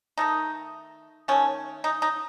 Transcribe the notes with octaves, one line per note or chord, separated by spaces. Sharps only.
D#3 A3 D#4
D#3 A3 C#4
D#4
D#4